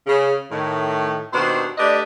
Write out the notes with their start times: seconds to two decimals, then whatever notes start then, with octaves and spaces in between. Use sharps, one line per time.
0.07 C#3
0.51 A2 D#3
1.33 D#2 B2 D#3 D4 C5
1.78 A3 D4 G4 B4 D5 D#5